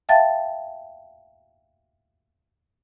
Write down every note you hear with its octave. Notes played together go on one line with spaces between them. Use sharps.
E5 F5 G5 A5 A6